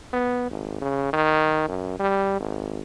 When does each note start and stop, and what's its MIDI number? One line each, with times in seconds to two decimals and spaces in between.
0.13 0.48 59
0.51 0.77 32
0.82 1.12 49
1.13 1.64 51
1.68 1.99 42
2.00 2.38 55
2.40 2.82 32